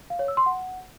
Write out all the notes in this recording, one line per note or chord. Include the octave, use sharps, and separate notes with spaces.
F5
C#5
E6
C6
F#5